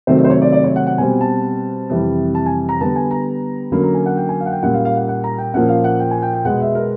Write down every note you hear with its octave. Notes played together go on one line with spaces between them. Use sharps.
C3 D#3 F#3 A3 C4 C5
C#5
C5
C#5
D5
D5
C#5
F#5
F#5
B2 G3 C4 G#5
A5
F2 C3 E3 G3
A5
G#5
A#5
D3 G3 B3 A5
G#5
A#5
D3 F#3 A#3 C#4 B5
A#5
G#5
F#5
G5
G#5
F5
F#5
G5
A#2 G3 A#3 C#4 F#5
F5
F5
F#5
F#5
A#5
G5
A#2 F3 A#3 C#4 F#5
F5
F#5
G5
G#5
G5
G5
B2 G#3 B3 F#5
E5
A#4